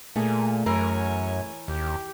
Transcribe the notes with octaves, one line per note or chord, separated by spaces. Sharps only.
A#2 A3 G#4 A#4 G#5
F#2 E3 A#4 C#5 G#5
D#2 G4